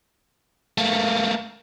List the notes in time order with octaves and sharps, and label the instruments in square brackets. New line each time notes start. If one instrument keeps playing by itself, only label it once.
[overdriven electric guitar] A3 A#3